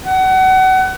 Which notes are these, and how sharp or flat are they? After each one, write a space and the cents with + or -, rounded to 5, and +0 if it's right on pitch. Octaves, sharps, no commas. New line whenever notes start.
F#5 +30